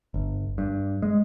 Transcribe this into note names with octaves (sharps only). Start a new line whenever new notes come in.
G1
G2
G#3